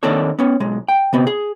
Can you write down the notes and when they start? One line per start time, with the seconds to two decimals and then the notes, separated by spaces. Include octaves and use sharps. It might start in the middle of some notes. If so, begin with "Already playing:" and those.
0.03 D#3 A#3 C4 D4 A4 C#5
0.39 B3 C#4
0.60 B1 G#3
0.88 G5
1.13 C3 B3 C4
1.27 G#4